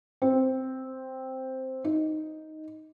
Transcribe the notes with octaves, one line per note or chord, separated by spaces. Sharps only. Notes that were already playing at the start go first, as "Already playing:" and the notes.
C4
D#4